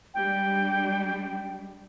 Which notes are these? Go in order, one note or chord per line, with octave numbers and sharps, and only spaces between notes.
G3 G#3 D4 G5